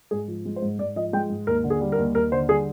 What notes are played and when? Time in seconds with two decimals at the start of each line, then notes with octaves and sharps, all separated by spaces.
0.11 G#2 G#4
0.28 F3
0.45 G#3
0.56 C5
0.62 G#2
0.79 G#2 D5
0.96 F3 D#5
1.13 G#3 G5
1.30 G#2
1.47 D#2 A#4
1.64 D3
1.70 G#4
1.81 G3
1.92 A#4
1.98 D#2
2.15 D#2 A#4
2.32 D3 C5
2.49 G3 G#4